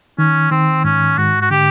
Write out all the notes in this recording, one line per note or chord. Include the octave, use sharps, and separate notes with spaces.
D#3 C#4
D#3 C4
G#2 C#4
G#2 F#4
F#4
D3 G4